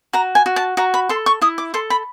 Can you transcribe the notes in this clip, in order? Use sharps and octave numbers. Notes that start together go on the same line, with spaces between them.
F#4 A#5
G#5
F#4
A5
F#4 A#5
B5
A4 C6
C#6
E4 D#6
D6
A4 C6
B5